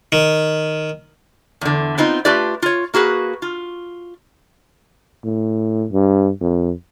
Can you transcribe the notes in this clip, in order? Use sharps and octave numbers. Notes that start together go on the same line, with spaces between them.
D#3
E2 D3
B3 C4 D#4 F4
A3 D4 F4 G4 B4 D5
F4 C#5
A#3 F#4 G#4 B4
F4
A2
G2
F2